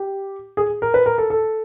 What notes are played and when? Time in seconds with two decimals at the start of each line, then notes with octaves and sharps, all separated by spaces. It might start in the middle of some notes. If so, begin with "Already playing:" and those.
Already playing: G4
0.57 G#4
0.82 A#4
0.94 B4
1.06 A#4
1.18 A4
1.30 A4